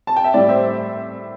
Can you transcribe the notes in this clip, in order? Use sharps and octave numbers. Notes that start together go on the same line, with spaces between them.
A5
G5
E5
A2 G3 D5
C5 E5